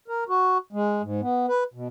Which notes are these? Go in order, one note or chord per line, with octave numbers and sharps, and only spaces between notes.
A#4
F#4
G#3
G#2
B3
B4
B2